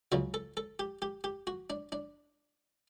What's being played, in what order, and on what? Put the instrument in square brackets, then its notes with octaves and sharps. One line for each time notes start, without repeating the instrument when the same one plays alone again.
[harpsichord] C#2 C#3 F#3 F#4
A4
A4
G4
G4
G4
F#4
D4
D4